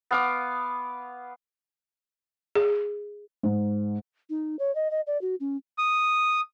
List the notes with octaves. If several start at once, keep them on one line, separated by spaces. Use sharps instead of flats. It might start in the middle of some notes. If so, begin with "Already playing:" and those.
B3 F5 D6
G#4
G#2
D#4
C#5
D#5
D#5
D5
F#4
C#4
D#6